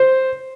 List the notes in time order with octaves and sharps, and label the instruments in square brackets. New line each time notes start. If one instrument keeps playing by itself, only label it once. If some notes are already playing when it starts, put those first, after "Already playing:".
Already playing: [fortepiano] C5